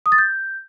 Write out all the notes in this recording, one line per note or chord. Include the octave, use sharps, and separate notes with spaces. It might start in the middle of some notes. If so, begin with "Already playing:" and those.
D#6
A6
G6